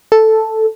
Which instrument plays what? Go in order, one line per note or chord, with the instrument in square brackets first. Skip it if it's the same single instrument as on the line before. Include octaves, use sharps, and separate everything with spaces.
[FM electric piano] A4